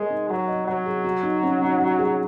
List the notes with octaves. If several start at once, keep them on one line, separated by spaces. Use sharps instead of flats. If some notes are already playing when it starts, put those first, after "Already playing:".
Already playing: G#3 A#4 C#5
D#4
F#3 C#5
D#5
F#3 C#5
G#4
F#4
D#4
C#4
D#4
F#4
G#4